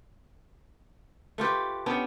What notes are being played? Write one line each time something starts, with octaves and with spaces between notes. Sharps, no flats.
A3 F4 G4 B4
B3 C#4 D4 G4